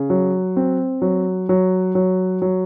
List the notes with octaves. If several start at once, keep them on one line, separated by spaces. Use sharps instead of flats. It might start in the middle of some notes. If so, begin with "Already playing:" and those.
Already playing: C#3
F#3
C4
F#3
F#3
F#3
F#3